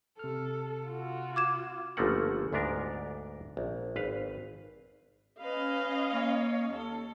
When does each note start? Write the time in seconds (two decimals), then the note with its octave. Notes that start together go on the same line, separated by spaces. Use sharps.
0.19 C3 A4 F6
0.86 F4 F#4
1.36 D6 G#6 E7
1.97 G1 C#3 F3 A3 A#3 F#5
2.53 D2 G#2 B3 D4 A#4
3.57 A#1
3.96 G#1 B4 F5
5.41 C#4 B4 D#5 F5
6.11 A#3 C#5
6.70 D#2 A4